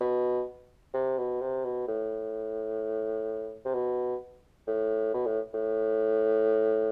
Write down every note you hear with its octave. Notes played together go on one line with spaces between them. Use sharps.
B2
C3
B2
C3
B2
A2
C3
B2
A2
B2
A2
A2